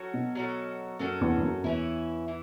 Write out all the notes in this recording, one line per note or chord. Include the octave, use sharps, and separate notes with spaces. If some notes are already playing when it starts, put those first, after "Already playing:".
Already playing: F#3 C#4 F#4 A4
B2
F#3 C#4 F#4 A4
F#2 F#3 C#4 F#4 A4
E2
E2
F#2
E2 E3 C#4 E4
E3